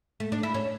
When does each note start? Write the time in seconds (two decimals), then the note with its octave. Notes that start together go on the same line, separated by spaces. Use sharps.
0.20 A3
0.32 D4
0.43 E4
0.54 C#4